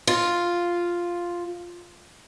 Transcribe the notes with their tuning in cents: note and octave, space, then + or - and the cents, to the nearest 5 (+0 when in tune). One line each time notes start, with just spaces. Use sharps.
F4 +0